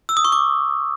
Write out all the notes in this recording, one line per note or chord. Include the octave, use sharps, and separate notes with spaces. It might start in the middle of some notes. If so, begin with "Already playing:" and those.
E6
D#6
C#6
D6